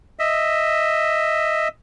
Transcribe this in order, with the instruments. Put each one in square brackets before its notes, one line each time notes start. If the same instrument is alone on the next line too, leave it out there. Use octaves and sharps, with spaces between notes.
[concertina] D#5 E5